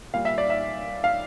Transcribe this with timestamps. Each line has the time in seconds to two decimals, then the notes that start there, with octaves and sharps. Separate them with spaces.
0.13 A#2 G3 F5
0.25 E5
0.38 D5
0.50 E5
1.04 F5